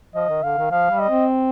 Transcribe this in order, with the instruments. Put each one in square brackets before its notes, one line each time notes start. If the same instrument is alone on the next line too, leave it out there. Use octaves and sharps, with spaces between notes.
[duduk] F3 [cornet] D#5
[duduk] D#3
[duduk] D3 [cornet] F5
[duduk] D#3
[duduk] F3 [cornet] F5
[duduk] G3
[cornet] D#5
[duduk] C4